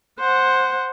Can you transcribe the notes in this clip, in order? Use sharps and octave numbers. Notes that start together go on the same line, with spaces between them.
C5 F#5